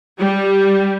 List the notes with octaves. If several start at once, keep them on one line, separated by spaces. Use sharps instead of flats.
G3